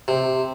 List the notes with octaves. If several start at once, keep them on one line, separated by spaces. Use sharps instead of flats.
C3